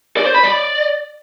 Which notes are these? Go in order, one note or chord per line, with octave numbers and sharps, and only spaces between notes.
D5
C5
B5
D5